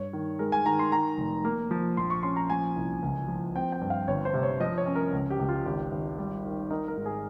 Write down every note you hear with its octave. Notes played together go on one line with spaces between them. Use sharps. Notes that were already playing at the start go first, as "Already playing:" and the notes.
Already playing: G2 C#5
D#3
G#3 A#4
G#5
D#3 A#5
C6
D#3 A#5
F1
A#3
F3
A#1 C6
C#6
C#4 C6
A#5
F3 G#5
C2
C#2
F3
C4 G5
G5
G2
F5
G1 C#5
C5
C3
C#5
F3 D#5
C#5
C#4
A#4
C#2
G4
C#2
F4
G#1 G4
G#1
G3
D#3
D#4 A#4
A#4
G#2
G#4